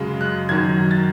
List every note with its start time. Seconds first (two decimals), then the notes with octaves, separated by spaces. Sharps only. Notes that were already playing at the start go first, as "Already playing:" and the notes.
Already playing: F#2 C#3 G#3
0.21 F#6
0.49 F#2 D#3 F#3 G#6
0.91 A6